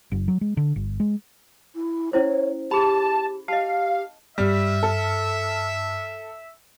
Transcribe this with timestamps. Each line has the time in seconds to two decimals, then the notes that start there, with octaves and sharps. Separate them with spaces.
0.12 F#1
0.28 F#3
0.41 G#3
0.57 D3
0.76 G1
1.00 G#3
1.75 E4
2.13 C#4 E4 C5 C#5
2.71 G4 G#4 A5 B5
3.48 G4 D#5 F5 A5
4.38 G2 G3 E5 F6
4.83 A4